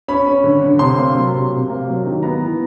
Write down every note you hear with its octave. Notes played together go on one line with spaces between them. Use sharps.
C#4 B5
C#4
D3
D3
C3 C6
A#3
F#3
C3
C3
A#3
F#3
D#3
B3 A#5
E3